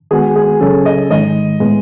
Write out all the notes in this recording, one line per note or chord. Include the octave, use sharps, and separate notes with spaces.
D#3 G#3 B3 F#4 G#4
G#4
C#2 C#3 F#3 C#4 G#4 A4
D#5
G#2 D#3 G#3 D#5
A2 G#3 B3